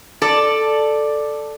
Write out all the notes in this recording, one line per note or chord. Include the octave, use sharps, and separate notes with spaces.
A4 D5